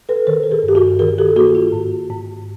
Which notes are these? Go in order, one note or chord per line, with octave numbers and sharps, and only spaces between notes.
A4 B4
D#3 A#4 C5
A4
G#4 A#4
G2
G4
F#4 G#4
D#3 G#4 A#4
G4 A4
A#3 F#4 G#4
F4
G#2
G#2